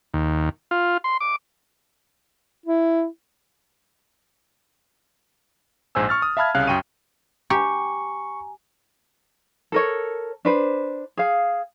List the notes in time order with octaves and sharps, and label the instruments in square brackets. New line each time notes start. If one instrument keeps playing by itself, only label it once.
[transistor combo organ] D#2
F4
C6
D6
[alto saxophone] E4
[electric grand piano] A#1 G#2 C5 G#5 E6
C#6 F6 A6
D#6
E5 F5 A5 B5 F6 G#6
C2 C#3 F5 F#6
F#2 G5 C#6 D#7
[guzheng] G4 [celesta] G#5 A#5 [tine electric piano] C#6
[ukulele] A4 A#4 C#5
D4 B4 C5
G#4 F5